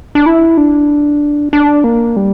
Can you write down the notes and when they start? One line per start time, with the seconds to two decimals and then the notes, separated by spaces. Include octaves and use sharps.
0.15 D4
0.26 E4
0.57 D4
1.53 D4
1.84 A#3
2.16 G3